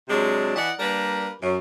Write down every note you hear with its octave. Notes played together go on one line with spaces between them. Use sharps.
C3 F#3 G#3 D4
E3 D5 D#5 F#5
G3 A#3 D4 A#4 B4
F#2